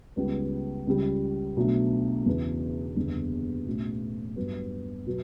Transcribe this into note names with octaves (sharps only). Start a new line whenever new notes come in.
C#2 C#3 G3 B3
C#2 C#3 G3
B1 B2 F#3 A3 D4
E2 C#3 E3
F#1 E2 D3 G3
B1 A2 F#3 A3 C#4
G2 F#3 B3
B2 F#3 B3